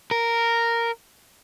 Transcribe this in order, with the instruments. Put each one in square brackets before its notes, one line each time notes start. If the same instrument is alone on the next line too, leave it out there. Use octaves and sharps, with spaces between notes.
[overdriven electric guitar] A#4